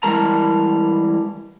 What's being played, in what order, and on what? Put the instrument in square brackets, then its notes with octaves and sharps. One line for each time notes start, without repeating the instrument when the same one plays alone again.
[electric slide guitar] E3 G3 G#3 A#4 A5 A#5